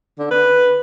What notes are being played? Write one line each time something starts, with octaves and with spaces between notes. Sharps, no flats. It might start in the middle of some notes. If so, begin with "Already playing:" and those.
D3
B4